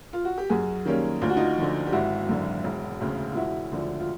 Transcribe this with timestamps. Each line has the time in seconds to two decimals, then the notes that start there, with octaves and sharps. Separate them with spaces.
0.13 F4
0.25 F#4
0.38 G4
0.50 F#2 F#4 G#4
0.85 D#3 G3 A#3 C#4
1.22 D2 F4
1.30 F#4
1.37 D#4 F4
1.58 D3 F3
1.87 G4
1.93 G#1 E4 F#4
2.29 F#2 D3
2.64 E1
3.00 D2 C#3
3.32 F4
3.35 E1 E4 F#4
3.72 D2 D3 F3
4.00 F4